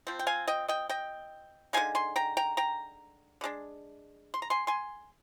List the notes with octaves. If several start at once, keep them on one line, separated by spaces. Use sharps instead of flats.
F3 C4
G5
F5 G#5
D#5 G5
D#5 G5
D#5 G5
D3 G#3 C4 D#4 F5 G#5
G#5 C6
G5 A#5
G5 A#5
G5 A#5
D3
G#3 D4
C6
A#5
G#5 C6
G#5 C6